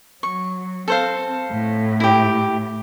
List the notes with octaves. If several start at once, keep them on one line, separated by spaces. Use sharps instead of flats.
F#3 C#6
C4 A4 C5 F5
A2
E4 G4